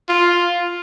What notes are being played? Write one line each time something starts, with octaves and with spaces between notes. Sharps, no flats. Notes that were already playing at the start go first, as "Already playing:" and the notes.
F4